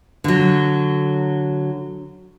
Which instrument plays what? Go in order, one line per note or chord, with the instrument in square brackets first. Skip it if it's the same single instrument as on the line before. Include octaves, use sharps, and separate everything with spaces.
[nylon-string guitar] D3 F#3